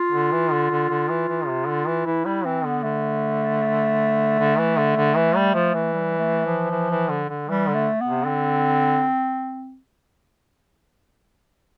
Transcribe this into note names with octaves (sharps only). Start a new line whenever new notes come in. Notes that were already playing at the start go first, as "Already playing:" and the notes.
Already playing: F4
D3
E3
D3
D3
D3
E3
E3
C3
D3
E3
E3 E4
G3 E4
E3 C4
D3 B3
D3 A3
D3
E3
D3
D3
E3
G3
F3
E3
G3
A3
F3
E3
E3
D3
D3
E3 G3
D3
A3
B3
C3
D3 C4